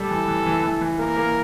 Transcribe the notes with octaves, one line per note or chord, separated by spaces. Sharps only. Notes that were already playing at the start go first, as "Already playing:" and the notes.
Already playing: G3 A4
E3
E3
E3
E3
E3
A#3 A#4
A#3